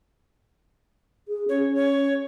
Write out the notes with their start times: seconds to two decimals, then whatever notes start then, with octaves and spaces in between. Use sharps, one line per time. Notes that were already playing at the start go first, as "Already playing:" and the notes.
1.28 G#4
1.49 C#4 C#5
1.75 C#5